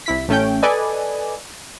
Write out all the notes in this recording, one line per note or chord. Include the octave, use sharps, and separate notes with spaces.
C2 E4 B6
A1 A3 C#4 G5
A4 B4 D5 D#5 G#5